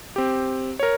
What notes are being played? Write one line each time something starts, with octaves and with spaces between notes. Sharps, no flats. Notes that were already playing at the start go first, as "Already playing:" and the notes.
C4 G4
A#4 C#5